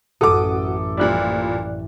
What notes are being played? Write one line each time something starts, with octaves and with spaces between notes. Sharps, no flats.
A1 F#2 F#4 A4 F#5 D6 D#6
A#2 F3 G3 D5 F#6